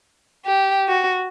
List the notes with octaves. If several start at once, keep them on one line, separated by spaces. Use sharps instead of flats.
G4
F#4